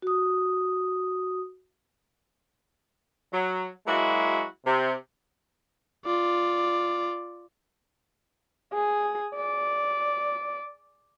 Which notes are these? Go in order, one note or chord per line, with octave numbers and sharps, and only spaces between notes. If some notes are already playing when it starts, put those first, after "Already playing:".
F#4 D#6
F#3
F#3 G#3 A#3 E4 F#4
C3
F4 D5
G#4
D5